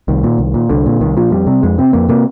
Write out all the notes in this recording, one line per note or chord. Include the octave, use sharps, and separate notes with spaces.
C2 D#3
A#2
C2
A#2
C2 D3
A#2
C2 D#3
A#2 F3
F2 G3
C3
F2 G#3
C3 C4
F2 A#3
C3 A#3